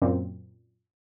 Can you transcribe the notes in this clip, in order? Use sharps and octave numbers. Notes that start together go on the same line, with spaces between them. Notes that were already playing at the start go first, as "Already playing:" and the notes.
F#2 A#2 C4